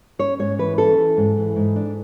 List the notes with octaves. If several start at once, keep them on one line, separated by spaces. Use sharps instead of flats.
C#4 C#5
G#2 C#5
E3 B4
C#4 A4
E3
G#2
E3
G#2
D4